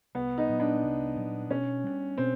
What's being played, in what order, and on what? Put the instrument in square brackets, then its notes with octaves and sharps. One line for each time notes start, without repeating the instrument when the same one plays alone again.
[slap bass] C2 [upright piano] B3
[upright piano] D#4
[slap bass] A#2 F#3 B3
[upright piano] D4
[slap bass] C2
A#2 F#3 B3
[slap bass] B2 [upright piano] C#4
[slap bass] G3 B3 D4
[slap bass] B2 [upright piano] C4